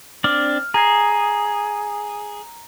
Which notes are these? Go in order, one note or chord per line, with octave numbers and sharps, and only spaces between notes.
C4 D4 D5 F6
G#4 A#5 G#6 C7